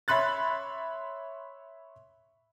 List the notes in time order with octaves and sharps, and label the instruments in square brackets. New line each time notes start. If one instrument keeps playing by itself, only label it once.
[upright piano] C#5 E5 B5 C6 F#6 A6